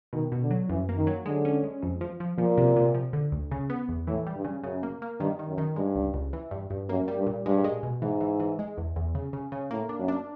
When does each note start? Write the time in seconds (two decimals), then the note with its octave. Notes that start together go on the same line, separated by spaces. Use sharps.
0.13 B2 D#3
0.32 B2
0.42 D3
0.51 F#3
0.69 F#2 E3
0.89 A#3
0.97 D#3
1.07 F#3
1.26 D3 G#3
1.45 C#4
1.64 G#3
1.83 F2
2.01 F3
2.20 F3
2.38 A#2 F3
2.58 C3
2.76 C3
2.94 F3
3.13 D3
3.32 D2
3.51 C#3
3.70 B3
3.89 E2
4.07 A2 E3
4.27 G3
4.36 G2
4.44 C#3
4.63 F#2 C#3
4.83 A#3
5.02 A#3
5.20 G2 D#3
5.39 D#3
5.48 F#2
5.58 D#3
5.76 G2 G#3
5.95 C#2
6.14 C#2
6.33 E3
6.51 G2
6.70 G2
6.89 F#2 A#3
7.08 G3
7.17 G2
7.27 A#2
7.46 G2 G#3
7.64 G#3
7.83 B2
8.02 G#2 E3
8.21 E3
8.40 E3
8.59 G#3
8.78 E2
8.96 E2
9.15 C#3
9.33 C#3
9.52 C#3
9.71 A2 A#3
9.89 D4
9.99 F#2
10.08 D4